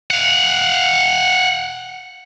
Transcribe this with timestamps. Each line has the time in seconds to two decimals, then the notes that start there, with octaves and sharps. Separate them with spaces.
0.10 F5 F#5